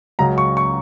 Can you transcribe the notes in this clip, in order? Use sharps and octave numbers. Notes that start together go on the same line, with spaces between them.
C#2 C#3 F#3 A#5
C#6
C#6